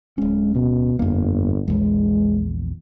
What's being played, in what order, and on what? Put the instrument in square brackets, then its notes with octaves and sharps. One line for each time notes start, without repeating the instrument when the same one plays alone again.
[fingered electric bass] D1 C#4 [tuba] G#3
[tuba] B2
[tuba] G1 [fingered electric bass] F2 A#3
[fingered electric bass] A#1 E2 [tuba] G#3